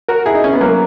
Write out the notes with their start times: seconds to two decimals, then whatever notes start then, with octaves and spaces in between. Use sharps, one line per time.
0.08 F#4 A#4
0.26 E4 G#4
0.35 D#4
0.44 C#4
0.53 B3
0.61 F#3 A#3